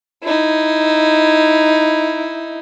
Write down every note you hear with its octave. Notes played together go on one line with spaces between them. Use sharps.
D#4 E4